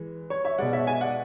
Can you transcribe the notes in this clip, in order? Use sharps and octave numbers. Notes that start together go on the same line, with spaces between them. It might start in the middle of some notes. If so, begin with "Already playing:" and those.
Already playing: E3 G#3
C#5
C#5 E5
B2 G#3 D5 F#5
C#5 E5
E5 G#5
D5 F#5